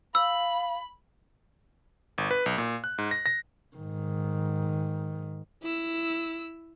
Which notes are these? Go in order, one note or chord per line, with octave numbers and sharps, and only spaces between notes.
F5 B5 E6
G1
B4
B1
A#2
F#6
G#2
A#6
A#6
G#2 D#3
E4 E6